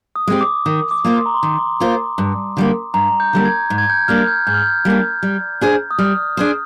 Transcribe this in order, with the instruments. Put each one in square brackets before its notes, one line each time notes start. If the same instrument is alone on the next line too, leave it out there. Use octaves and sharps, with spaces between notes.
[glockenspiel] D#6
[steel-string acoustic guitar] G#3 C4 G4
[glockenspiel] D6
[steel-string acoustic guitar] D#3 [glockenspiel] D#6
[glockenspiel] D6
[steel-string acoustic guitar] A#3 F4 C5
[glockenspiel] C6
A#5
C6
[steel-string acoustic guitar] D#3
A#3 F4 C5
G2
D3 G3 A#3
[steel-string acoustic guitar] G2 [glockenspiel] A#5
[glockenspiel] G6
[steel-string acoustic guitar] D3 G3 A#3
[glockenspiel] G#6
[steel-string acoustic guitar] G#2
[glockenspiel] G#6
G6
[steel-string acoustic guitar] G3 A#3 D4 [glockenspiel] F6
[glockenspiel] G6
[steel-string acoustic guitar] G#2 [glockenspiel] G6
[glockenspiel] F6
G6
[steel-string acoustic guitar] G3 A#3 D4
G3
D4 G#4 C5
[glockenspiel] D#6
[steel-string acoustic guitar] G3 [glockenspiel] F6
[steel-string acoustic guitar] D4 G#4 C5